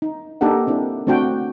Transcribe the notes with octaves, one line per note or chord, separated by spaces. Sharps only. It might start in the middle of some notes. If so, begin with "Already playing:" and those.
D#4
A#3 D4 D#4 G4 A4 F#5
C4 D4 E4 A#4
A3 C4 D4 F#4 G5